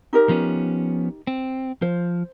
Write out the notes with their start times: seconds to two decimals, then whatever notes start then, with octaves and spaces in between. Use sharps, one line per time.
0.13 D#4 G4 A#4
0.29 F3 B3 C#4
1.27 C4
1.82 F3 C5